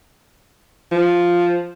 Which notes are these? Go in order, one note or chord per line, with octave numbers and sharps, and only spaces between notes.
F3